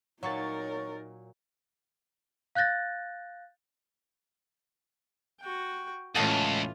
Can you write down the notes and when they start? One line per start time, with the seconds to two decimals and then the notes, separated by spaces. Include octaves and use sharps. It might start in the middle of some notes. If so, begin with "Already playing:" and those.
0.23 A#2 F#3 D#4 A#4 C#5 C#6 A6
2.55 F5 F#6 G6 A6 A#6
5.40 F#4 G5
6.15 C#2 A2 E3 C#4 F4 F#5 A5 D#6